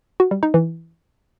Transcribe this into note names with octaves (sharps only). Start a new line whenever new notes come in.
F#4
G3
D#4
E3